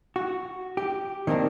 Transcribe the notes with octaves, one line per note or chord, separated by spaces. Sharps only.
F#4
G4
D#3 A#3 C4 D4 A#4